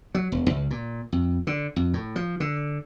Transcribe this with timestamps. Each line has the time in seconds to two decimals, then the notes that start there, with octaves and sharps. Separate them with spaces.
0.15 F#3
0.32 E1
0.50 C#2
0.71 A#2
1.12 F2
1.47 D3
1.76 F2
1.93 A2
2.16 F3
2.40 D3